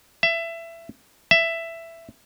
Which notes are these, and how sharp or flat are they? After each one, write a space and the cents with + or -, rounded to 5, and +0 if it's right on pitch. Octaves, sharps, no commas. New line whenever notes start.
E5 +20
E5 +10